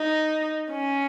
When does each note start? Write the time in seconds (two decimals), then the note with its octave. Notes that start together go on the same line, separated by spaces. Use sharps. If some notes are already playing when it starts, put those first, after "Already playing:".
Already playing: D#4
0.71 C#4